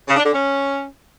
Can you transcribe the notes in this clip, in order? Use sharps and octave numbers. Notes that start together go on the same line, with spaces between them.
C#3
D4
D3
C#4